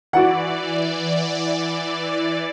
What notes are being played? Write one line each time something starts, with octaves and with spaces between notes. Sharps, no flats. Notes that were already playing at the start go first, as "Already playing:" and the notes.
E3 F#4 D5 F#5